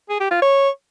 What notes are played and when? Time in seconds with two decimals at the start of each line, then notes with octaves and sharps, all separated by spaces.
0.10 G#4
0.20 G4
0.31 F4
0.42 C#5